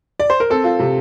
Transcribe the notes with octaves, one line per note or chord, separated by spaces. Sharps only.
D5
C5
A#4
C4 A4
F4
C3